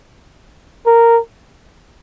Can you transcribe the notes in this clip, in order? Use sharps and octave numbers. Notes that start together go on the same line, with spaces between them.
A#4